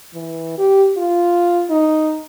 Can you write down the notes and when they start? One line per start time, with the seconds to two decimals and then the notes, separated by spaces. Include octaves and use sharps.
0.14 E3
0.58 G4
0.97 F4
1.70 D#4